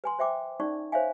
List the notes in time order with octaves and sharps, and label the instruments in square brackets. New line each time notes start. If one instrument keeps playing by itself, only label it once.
[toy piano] B4 G#5 C6
C5 E5 G5 D6
C#4 D#4 D5 C#6
C5 C#5 E5 F5 G#5